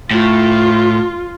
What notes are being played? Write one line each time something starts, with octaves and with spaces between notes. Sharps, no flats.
A2 F4